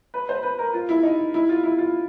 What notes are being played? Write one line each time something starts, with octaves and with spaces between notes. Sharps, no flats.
B4
C5
B4
A#4
F4
E4
D#4
E4
F4
E4
F4